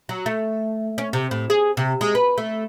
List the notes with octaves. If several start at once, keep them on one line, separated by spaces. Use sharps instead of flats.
F#3
A3
C#4
C3
A2
G#4
C3
G#3
B4
A3